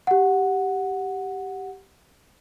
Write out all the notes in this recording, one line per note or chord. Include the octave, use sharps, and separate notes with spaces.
G4 F#5